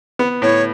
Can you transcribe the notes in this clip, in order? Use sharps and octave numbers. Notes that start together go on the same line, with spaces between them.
B3
A2 C#5